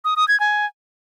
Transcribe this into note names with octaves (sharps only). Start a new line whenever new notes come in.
D#6
D#6
G#6
G#5